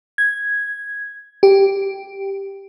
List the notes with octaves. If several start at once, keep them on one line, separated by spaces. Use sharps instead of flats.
G#6
G4